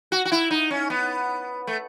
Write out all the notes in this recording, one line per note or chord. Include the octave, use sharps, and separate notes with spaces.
F#4
F#4
E4
D#4
C#4
B3
A3